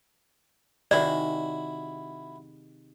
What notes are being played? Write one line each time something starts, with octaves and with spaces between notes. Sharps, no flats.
C3 D#3 E4 F#4 G#4 D5